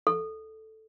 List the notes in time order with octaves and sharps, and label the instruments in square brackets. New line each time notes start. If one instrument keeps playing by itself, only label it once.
[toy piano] A4